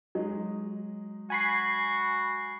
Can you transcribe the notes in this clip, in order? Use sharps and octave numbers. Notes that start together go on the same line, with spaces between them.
F#3 G#3 D#4
F#4 G#5 B5 C7